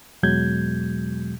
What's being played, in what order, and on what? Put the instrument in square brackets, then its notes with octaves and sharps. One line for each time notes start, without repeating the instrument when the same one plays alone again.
[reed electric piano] E2 B2 F#3 G#3 G6 G#6